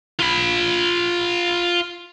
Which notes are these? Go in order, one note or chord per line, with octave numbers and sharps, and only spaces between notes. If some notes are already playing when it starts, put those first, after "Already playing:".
F4 B5